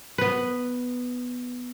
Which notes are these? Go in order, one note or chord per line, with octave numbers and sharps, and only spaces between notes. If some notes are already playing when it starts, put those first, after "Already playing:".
B3 B4